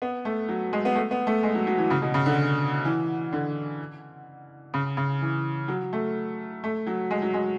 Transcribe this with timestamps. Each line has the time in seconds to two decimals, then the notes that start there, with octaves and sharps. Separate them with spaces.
0.02 B3
0.25 A3
0.49 F#3
0.73 G#3
0.85 B3
0.95 A3
1.11 B3
1.27 A3
1.43 G#3
1.55 F#3
1.67 F#3
1.78 E3
1.90 C#3
2.02 B2
2.14 C#3
2.26 D3
2.85 E3
3.32 D3
4.74 C#3
4.97 C#3
5.22 E3
5.68 F#3
5.93 A3
6.64 A3
6.87 F#3
7.11 G#3
7.22 F#3
7.34 G#3